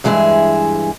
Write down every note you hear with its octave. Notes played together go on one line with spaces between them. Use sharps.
G2 E3 G#3 G#4 E5